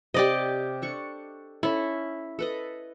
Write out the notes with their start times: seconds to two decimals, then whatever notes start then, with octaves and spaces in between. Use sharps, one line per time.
0.14 C3 G4 D5 D#5
0.82 D4 A4 C#6
1.63 C#4 E4 A4
2.39 A4 B4 D#5